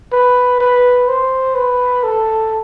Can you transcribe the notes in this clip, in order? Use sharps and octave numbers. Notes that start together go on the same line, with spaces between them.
B4
B4
C5
B4
A4